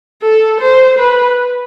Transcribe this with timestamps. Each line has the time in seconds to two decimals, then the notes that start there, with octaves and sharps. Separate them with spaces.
0.22 A4
0.61 C5
0.99 B4